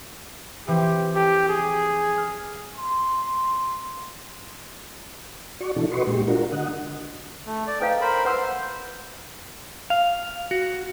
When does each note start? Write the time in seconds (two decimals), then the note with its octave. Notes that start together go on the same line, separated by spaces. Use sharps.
0.67 E3 F3 C4 G4
1.15 G4 A4
1.49 G#4
2.18 F6
2.75 C6
5.60 F#4 D5 C#6
5.76 B2 E3 D4 E4 A4
5.92 F#4 B4 D#5 C6 C#6
6.07 A#2 G#3 G4
6.27 D4 F4 F#4 A#4
6.52 D3 D#5 F#5
7.47 A3
7.67 D5
7.80 D#4 A4 B4 F5 G5
8.01 A#4 C5 B5
8.25 B4 C5 F#5 C6 E6
9.90 F5
10.51 F#4